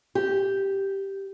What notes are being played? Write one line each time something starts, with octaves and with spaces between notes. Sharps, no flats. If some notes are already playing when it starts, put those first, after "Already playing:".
G4